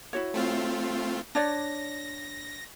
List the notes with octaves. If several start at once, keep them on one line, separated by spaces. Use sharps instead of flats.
E4 F#4 C#5
A3 C4 F4
D4 C#5 D5 A#6